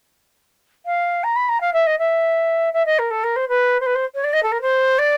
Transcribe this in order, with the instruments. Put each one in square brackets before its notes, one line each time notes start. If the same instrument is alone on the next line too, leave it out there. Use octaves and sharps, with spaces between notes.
[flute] F5
A#5
B5
A#5
F5
E5
D#5
E5
E5
D#5
A#4
A4
A#4
C5
B4
C5
B4
C5
C#5
D5
D#5
A4
A#4
C5
D5